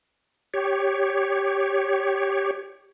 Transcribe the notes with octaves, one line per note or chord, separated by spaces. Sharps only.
G4 C#5